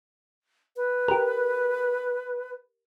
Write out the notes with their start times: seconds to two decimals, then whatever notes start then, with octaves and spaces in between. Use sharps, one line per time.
0.77 B4
1.08 G4 A#4